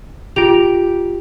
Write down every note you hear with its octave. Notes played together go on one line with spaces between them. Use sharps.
F4 G4 D7 F7